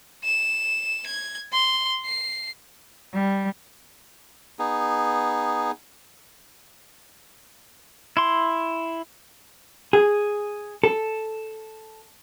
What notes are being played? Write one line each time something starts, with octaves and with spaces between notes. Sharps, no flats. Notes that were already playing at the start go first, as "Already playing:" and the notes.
E7
G#6
C6
C7
G3
B3 D#4 G#4
E4 C6
G#4
A4